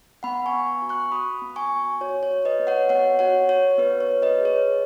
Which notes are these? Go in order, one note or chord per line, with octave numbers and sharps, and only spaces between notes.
B3 F#5 B5
G#5 C#6
B3
F#4
C#6 F#6
F#4 B5 D#6
B3
G#5 C#6
B3
F#4 C#5
C#5
F#4
B4 D#5
B3
C#5 F#5
B3 C#5 F#5
F#4 C#5 F#5
F#4 C#5
B3 B4
C#5
B3
B4 D#5
G#4
C#5
G#4